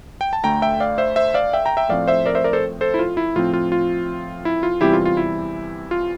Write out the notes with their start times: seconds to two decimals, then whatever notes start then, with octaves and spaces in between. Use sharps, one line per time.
0.21 G5
0.33 A5
0.43 D2 D3 A3 G5 A#5
0.62 E5 G5
0.80 D5 F5
0.98 C5 E5
1.16 C5 E5
1.34 D5 F5
1.53 E5 G5
1.66 G5 A#5
1.77 E5 G5
1.89 A2 F3 A3 C4 D5 F5
2.08 C5 E5
2.26 A#4 D5
2.35 C5 E5
2.44 A#4 D5
2.53 A4 C5
2.81 A4 C5
2.94 E4
2.99 F4
3.17 E4
3.36 A2 F3 C4 F4
3.53 F4
3.72 F4
4.45 E4
4.63 F4
4.81 E2 C3 E3 G3 C4 E4 G4
4.93 F4
5.05 F4
5.17 E4
5.91 F4